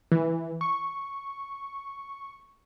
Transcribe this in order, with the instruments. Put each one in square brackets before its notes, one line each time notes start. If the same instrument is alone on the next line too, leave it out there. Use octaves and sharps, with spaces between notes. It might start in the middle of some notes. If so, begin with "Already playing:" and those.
[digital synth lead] E3
C#6